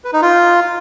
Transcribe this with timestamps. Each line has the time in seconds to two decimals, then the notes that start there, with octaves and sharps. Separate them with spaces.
0.04 B4
0.13 D#4
0.22 F4